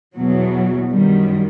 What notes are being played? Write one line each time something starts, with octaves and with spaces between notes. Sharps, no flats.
E2 B2 F#3
F#2 D#3 G3